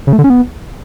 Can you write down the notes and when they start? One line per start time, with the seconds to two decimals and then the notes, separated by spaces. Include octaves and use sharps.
0.07 C#3
0.13 A3
0.18 D3
0.24 C#4
0.30 B3